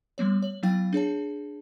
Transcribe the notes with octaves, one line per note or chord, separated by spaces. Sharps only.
G3 A3 B3 C#5
C#5 F#7
F#3 B3 E4 F5 G5 A6
D4 G#4 C#5 A5